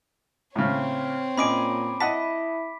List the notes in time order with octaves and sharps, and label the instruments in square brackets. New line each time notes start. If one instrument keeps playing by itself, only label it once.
[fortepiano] A2 C#3 [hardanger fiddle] C4 C#5
[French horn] A#2 [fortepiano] C#4 D#5 G#5 [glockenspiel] B5 D6 D7
[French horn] E4 [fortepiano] D#5 F#5 A5 [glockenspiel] B6